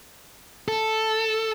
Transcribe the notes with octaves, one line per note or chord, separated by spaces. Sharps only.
A4